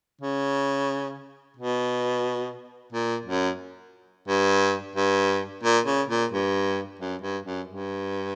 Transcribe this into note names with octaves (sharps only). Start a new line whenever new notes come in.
C#3
B2
A#2
F#2
G2
G2
A#2
C#3
A#2
G2
F#2
G2
F#2
G2